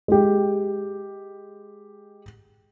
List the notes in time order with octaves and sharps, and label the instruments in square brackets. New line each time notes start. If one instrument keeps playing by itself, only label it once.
[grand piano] G#3 G4